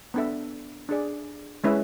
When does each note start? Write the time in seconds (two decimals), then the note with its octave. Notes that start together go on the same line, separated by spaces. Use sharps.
0.14 B3 D4 A4 E5
0.89 D4 G#4 D5
1.64 G#3 C#4 E4 B4 E5